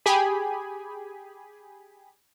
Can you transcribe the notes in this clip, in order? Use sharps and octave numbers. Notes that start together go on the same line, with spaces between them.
G4 G#4 G#5 B5